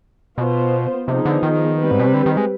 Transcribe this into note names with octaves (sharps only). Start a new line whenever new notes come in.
B2 B3 F4 C5
C3 F3 B3 D#4 G#4
D3
D#3
G3 C4 G4 B4
G#2
B2
C3
D3
D#3
G#3